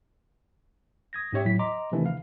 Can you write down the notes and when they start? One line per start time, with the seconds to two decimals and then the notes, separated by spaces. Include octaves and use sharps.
1.13 D#6 G#6 A#6
1.33 G#2 C#4 G4 C#5 E5 G5
1.45 A2 F#3 E4 B6
1.59 D#5 A#5 C6 D6
1.92 C3 D#3 E3 A3 D4
2.06 F5